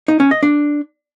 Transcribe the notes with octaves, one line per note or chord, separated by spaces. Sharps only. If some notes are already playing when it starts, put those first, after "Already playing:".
D#4
C#4
D#5
D4